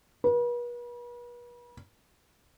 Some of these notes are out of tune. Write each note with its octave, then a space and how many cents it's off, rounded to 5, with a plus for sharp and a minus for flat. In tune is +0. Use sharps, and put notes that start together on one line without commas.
B4 -40